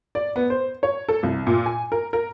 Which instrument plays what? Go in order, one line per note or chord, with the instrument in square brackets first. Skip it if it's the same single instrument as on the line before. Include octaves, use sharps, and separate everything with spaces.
[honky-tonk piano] D5
B3
C5
C#5
A4
C2
A#2
G#5
A#4
A#4